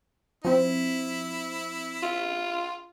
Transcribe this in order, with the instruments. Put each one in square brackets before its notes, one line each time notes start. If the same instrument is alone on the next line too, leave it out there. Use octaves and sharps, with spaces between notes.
[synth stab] F3 C4 [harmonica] E4
[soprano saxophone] F4